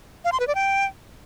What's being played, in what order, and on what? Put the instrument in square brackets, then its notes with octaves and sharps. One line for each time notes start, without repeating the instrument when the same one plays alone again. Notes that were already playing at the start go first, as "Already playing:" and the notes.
[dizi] F5
C6
B4
D5
G5